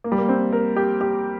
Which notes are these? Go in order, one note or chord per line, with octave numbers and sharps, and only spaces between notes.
A#3
G3
A#3
C4
A#4
G4
G4